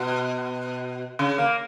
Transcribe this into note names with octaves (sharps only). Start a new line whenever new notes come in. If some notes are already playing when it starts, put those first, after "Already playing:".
Already playing: B2
C#3
A#3